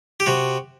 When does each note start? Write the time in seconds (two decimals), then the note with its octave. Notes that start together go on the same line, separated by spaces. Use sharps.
0.20 G4
0.26 C3 F#4